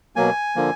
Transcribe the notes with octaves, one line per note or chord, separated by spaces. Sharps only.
B2 F#3 A#3 G#5
D3 F3 A#3